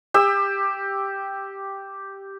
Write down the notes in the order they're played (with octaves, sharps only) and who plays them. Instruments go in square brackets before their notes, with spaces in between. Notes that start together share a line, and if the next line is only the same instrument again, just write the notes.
[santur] G4 E6